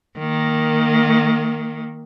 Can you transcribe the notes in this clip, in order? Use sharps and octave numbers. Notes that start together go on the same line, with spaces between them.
D#3 A#3